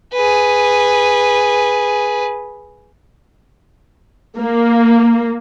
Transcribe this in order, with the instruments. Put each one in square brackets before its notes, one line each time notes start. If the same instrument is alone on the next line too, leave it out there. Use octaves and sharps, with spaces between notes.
[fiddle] G#4 B4
[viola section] A#3